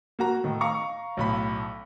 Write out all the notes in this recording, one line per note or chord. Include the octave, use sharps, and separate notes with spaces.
A#3 F#4 A#5
A2 D#3
F5 A#5 C#6
B1 A2 B5